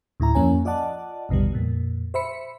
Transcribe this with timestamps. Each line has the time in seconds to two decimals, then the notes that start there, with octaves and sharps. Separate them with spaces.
0.20 D2 A2 E4 A#5
0.35 F2 F3 A#3 C#4 C#5 G#5
0.65 F4 D5 D#5 F#5 A5
1.29 A1 E2 B2 D3 G3
1.53 F2 A#2
2.14 C5 E5 B5 C#7